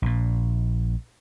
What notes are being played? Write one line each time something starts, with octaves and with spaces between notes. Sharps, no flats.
A#1 A#2